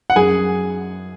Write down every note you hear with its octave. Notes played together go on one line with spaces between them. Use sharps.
F#5
F#2 G#4 G#5